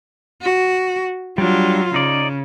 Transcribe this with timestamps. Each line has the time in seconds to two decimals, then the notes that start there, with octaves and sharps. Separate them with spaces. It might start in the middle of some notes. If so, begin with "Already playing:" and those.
0.42 F#4
1.38 F#3 G3 D4 F4
1.94 C#3 D#4 D5